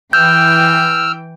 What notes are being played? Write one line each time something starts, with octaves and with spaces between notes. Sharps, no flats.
E3 G5 E6 F6 G6